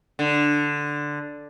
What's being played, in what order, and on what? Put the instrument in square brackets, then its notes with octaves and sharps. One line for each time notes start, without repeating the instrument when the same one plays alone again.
[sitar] D3